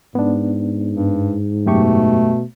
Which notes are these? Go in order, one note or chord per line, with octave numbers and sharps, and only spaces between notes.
G#2 B3 D4
G2
F#2 B2 A3 G4 C#6